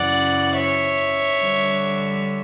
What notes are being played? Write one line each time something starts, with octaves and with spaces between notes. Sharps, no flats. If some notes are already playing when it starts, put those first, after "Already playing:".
Already playing: F#2 C#3 E3 D5 F#5
C#5 E5
D3 G3 D4